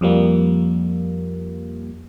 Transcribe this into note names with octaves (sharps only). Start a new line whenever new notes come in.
F2 F3 G3 A#3